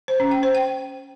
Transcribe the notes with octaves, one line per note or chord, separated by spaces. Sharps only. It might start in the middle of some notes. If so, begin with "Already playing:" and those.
C5
C#4
G5
C5
G5